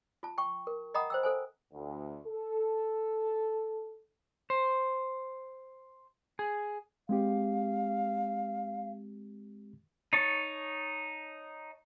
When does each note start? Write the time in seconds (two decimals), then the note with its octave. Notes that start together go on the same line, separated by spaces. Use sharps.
0.23 F4 A5
0.38 G5 C#6
0.67 A#4
0.94 D#5 F#5 G5 A#5 B5 D#6
1.10 C5 G5 E6
1.23 A4 C5 G#5
1.73 D2
2.27 A4
4.50 C5
6.39 G#4
7.09 G#3 C4 G4 F5
10.13 D#4 C#5 A5